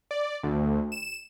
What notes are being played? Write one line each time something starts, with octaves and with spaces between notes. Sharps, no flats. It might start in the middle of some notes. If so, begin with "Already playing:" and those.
D5
D2
E7